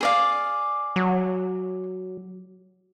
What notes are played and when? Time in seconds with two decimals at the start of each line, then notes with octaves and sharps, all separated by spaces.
0.01 G#4 D5 F5
0.96 F#3